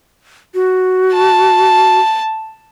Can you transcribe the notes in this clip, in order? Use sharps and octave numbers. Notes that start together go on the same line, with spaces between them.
F#4
A5